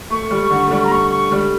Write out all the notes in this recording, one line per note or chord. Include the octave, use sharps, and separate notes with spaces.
A3 C#6
G3
D3
A3
G3
A#5
A3 C#6
C#6
G3